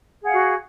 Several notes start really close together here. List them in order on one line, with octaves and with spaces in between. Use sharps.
G#4 F#5 F5 F#4